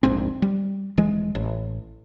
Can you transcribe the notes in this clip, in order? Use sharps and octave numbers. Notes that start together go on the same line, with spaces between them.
D#1 A#1 G#2 C4
G3
D#1 E3 G#3
A1